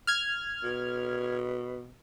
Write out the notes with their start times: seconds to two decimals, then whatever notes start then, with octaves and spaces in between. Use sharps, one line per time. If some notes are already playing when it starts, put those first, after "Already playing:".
0.07 F6 G#6
0.64 B2